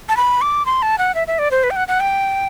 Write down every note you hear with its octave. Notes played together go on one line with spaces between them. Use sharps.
A5
B5
D6
C6
A5
F#5
E5
E5
D5
C5
B4
G5
F#5
F#5
G5